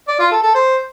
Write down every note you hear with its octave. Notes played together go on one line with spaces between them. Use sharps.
D5
F4
A4
A4
C5